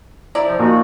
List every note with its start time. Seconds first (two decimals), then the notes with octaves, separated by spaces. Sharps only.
0.35 E4 D5 A#5
0.47 C3 F3
0.59 A#2 F3 D#4 F#4